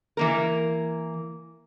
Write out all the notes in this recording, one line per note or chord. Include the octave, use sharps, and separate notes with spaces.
E3 A#3 A#4